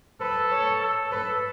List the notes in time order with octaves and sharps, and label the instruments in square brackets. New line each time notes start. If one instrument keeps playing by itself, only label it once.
[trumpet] A4 [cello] B4
[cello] C#5
[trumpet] A4
[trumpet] A4 [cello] B4